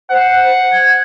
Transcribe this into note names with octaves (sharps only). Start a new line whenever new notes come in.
C5 F#5
G#6